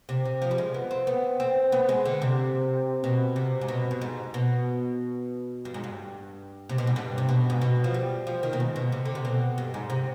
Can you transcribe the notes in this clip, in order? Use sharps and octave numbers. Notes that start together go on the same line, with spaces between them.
C3
C3
F3
G3
G#3
B3
C4
B3
C4
B3
G#3
D3
C3
B2
C3
G#2
B2
G2
G#2
B2
G2
G#2
G2
C3
B2
G#2
G2
C3
B2
G#2
B2
F3
G3
F3
D#3
B2
G#2
B2
C3
D3
C3
B2
G2
G#2
C3